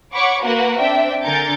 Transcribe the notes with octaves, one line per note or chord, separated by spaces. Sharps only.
C#5 F#5 B5 C#6 D6
A#3 F#4 A#4 B4 F#5
C4 D4 E5 G5
D3 A#4 G#5 G6 A6 C#7